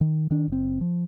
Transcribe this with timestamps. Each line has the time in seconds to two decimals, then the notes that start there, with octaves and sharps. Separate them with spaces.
0.01 D#3
0.31 D#3 D4
0.48 F#1 C4
0.81 F3